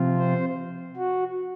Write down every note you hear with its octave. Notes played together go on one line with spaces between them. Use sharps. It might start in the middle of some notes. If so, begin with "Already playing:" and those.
Already playing: C3 F3 C4 F4
C5
F#4